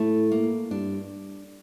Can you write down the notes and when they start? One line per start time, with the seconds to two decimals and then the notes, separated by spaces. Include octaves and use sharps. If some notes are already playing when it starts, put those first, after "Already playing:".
Already playing: A2 A3
0.32 A#3
0.71 G2 D4